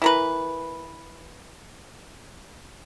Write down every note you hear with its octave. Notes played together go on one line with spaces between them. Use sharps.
E3 A#4 B4